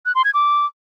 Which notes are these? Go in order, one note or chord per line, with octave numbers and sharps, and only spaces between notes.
F#6
C6
G#6
D6